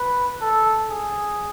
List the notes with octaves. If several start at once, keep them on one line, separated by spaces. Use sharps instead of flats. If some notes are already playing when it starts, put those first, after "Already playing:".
Already playing: B4
A4
G#4